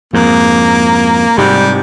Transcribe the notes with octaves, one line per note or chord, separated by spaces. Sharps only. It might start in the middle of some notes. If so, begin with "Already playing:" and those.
F2 G#2 A#3
G#2 C3 G3